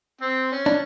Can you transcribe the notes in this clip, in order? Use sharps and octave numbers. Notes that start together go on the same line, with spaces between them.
C4
C#4
D4